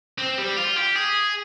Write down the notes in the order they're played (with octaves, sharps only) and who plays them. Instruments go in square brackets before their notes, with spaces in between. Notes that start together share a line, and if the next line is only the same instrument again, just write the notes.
[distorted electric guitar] C4
G3
F4
G4
G#4